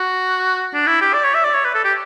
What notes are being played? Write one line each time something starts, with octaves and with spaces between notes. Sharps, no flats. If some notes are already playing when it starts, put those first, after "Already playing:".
Already playing: F#4
D4
E4
G4
D5
C#5
E5
D5
C#5
B4
A4
G4